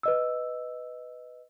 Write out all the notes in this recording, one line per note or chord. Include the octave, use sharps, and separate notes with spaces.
B4 D#5 E6